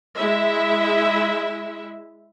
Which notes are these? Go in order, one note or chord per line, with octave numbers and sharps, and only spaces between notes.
G#3 E4 E5